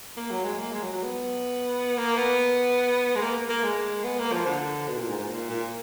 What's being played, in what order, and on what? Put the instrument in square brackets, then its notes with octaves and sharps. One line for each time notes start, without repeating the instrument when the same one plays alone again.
[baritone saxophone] A#3
F#3
G#3
A#3
G#3
F#3
F#3
B3
A#3
B3
G#3
A#3
A#3
G#3
B3
A#3
F3
D3
B2
A#2
G#2
G#2
A#2
A#2